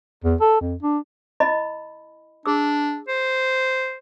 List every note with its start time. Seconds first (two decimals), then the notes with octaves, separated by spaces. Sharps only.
0.25 E2
0.41 A4
0.61 F2
0.83 D4
1.40 E4 D#5 B5
2.46 D4 G#4 E6
3.08 C5